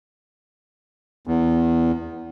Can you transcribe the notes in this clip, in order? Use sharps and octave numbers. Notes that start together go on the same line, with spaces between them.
E2